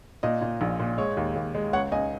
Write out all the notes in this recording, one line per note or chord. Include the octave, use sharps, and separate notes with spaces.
A#2 D#5
A#2
A#1
A#2
G#3 C#5
D#2
D#2
G#3
C#2 C#5 F#5
C#2 D#5 G#5